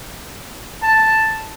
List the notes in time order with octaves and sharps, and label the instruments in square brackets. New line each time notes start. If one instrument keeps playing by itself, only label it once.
[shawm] A5